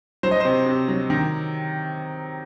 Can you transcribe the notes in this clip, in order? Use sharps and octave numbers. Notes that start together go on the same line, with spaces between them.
F#3 C5
D#5
C3 C5
C3
F#3
D#3